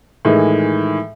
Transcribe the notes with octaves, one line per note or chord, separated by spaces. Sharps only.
A2 D#3 E3 G#3